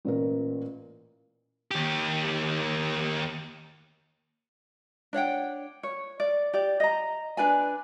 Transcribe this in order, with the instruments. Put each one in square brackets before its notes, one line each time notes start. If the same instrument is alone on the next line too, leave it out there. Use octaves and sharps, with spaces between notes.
[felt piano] A1 A#2 A#4
[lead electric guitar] D#2 G4
[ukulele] D4 C#5 F#5 G5
C#5
D5
G4 D5
D#5 A#5
D4 B4 D5 G#5